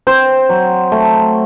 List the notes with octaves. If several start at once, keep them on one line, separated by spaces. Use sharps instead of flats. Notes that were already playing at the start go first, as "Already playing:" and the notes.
C4 C5
F#3
A3